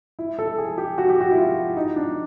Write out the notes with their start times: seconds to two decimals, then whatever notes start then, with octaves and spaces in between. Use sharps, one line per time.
0.19 E4
0.39 A4
0.58 G#4
0.78 G4
0.98 F#4
1.09 G4
1.21 F#4
1.31 E4
1.37 F4
1.77 D#4
1.96 D4